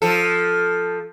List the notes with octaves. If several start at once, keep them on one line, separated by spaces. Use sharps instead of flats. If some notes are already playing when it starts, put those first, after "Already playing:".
F3 A4